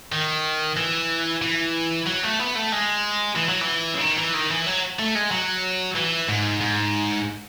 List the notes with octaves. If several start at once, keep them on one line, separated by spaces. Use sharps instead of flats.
D#3
E3
E3
F#3
A3
B3
A3
G#3
E3
F#3
E3
C#3
D#3
E3
D#3
E3
F#3
A3
G#3
F#3
E3
G#2
G#2